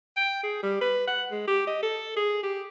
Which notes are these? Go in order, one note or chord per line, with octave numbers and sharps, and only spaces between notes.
G5
G#4
G3
B4
F#5
G#3
G4
D#5
A4
G#4
G4